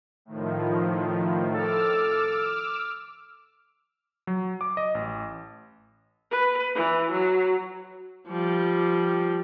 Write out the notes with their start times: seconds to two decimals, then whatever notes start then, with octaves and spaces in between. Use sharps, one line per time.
0.25 A2 D#3 F3
1.54 A4 D6 E6 F6
4.27 F#3
4.61 D6
4.77 D#5
4.95 A1
6.31 B4
6.75 E3
7.11 F#3
8.28 F3 G3